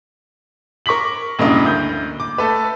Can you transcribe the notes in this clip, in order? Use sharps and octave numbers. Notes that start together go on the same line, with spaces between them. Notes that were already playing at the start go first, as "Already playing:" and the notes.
A#4 C#6 D6 B6 F#7
E1 G2 C#3 A#3 E4 D#5
D2 G6
D6
A3 A4 B4